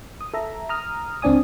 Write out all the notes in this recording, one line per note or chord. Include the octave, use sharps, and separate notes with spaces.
D#6
A4 E5 A#5
A#5 D#6 F6
C#2 C4 D4 D5 G#5 D#6